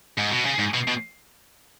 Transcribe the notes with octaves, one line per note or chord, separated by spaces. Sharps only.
G#2
B2
C#3
G#2
B2
B2